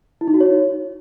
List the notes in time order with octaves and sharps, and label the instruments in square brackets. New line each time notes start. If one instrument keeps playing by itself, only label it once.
[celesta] E4
D#4
F#4
C#5